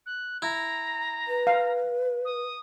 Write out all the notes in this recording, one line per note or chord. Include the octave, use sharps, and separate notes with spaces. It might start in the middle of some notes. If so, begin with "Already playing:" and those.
F#6
E4 A#5
B4
F5
D#6